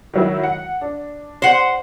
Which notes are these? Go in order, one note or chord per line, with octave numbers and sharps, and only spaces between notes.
D#3 F#3 E4
F#5
D4
C5 F#5